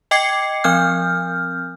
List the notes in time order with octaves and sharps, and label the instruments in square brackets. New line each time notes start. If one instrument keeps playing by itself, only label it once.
[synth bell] D#5 G5 D6 G#6 C7 C#7
F3 C4 F6 G6